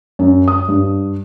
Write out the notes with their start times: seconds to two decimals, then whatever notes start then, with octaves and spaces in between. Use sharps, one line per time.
0.19 F#2
0.48 D#6
0.68 G2